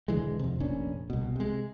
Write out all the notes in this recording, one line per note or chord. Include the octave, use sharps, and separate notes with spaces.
E1 D3 E3 G#3
F2 C3
F1 A#1 C#4 D4
C2 B2
C3 G#3